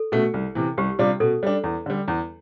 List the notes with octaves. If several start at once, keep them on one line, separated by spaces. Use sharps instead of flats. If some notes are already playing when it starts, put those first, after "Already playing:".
Already playing: A4
B2 A3
C2
C3 E3
C2 G4
C3 G3 D4 F4
B2 A4
G3 D4
E2
D3 G3
E2